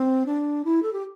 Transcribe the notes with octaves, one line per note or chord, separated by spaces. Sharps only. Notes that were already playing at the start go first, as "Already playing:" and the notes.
Already playing: C4
D4
E4
A4
G4